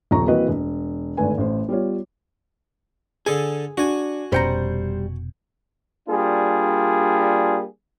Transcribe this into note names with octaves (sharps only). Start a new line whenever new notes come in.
D#1 B2 F3 A#5 C#6
E3 A#3 C4 F#4 B4 D#5
E1
G#1 D3 A3 B4 G#5
A1 A2 C5
G3 B3 F4 C#5
D3 G#4 A4 G#5
D4 F#4 G#5
F1 B2 G3 C#4 C5 G5 A#5 C#7
G3 A#3 D4 F4 G#4